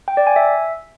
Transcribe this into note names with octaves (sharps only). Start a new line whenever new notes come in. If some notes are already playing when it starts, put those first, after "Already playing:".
G5
D5
G#5
E5